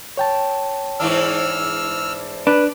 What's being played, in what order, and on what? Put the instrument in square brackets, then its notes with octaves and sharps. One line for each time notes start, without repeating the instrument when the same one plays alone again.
[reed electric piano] C#5 G5 A5
[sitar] G#2 E3 D4 [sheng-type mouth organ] E6 F6
[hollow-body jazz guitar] D4 [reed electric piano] B4 F#6